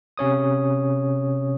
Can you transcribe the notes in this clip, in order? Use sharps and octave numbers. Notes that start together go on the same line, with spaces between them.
C3 C#4 C#5 D#6